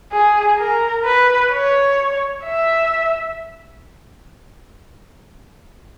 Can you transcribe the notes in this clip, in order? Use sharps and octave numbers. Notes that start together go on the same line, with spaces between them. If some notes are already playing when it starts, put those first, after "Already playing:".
G#4
A#4
B4
C#5
E5